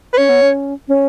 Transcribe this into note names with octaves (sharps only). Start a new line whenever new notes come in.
B4
C#4 C#5
B3
C#4
C#4